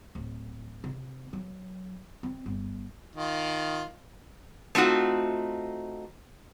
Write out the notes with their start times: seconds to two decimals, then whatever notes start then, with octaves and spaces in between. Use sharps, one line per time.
0.15 D1
0.84 C3
1.33 F#3
2.23 C4
2.46 G1
3.16 D#3 F4
4.75 A3 C4 D#4 F4 F#4